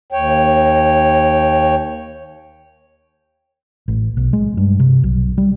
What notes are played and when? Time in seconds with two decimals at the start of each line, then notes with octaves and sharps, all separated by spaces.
0.12 D#2 C#5 G5
3.88 A1
4.17 B1
4.33 G#3
4.57 G2
4.80 C3
5.04 B1
5.38 G3